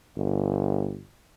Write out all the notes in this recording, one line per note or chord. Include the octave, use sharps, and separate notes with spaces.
G1